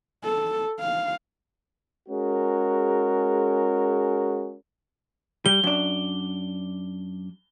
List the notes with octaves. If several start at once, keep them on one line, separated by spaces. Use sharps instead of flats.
A4
F5
G#3 C#4 F#4 G#4 A#4
G3 G7
F#2 D4